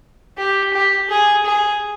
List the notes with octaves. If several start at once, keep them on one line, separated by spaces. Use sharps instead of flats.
G4
G4
G#4
G#4